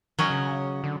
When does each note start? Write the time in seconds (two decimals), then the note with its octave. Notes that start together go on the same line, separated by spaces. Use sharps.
0.19 D#3 F#3 C#4 D#5
0.30 C#3
0.84 D3